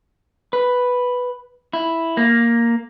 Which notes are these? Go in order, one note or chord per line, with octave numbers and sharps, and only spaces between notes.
B4
E4
A#3